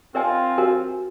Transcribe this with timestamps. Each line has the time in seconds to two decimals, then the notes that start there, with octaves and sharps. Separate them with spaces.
0.15 C4 F4 A#4 D#5 G#5
0.58 F#4 A#4 G#5